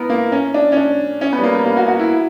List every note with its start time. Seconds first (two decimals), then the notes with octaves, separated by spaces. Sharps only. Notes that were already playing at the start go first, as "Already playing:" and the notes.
Already playing: B3 E4 A#4
0.10 A#3
0.32 C#4
0.54 D4
0.72 C#4
0.77 D4
1.21 C#4
1.33 B3
1.38 G3
1.43 A#3
1.55 G3
1.65 A#3
1.77 F#4
1.88 F#4
1.99 E4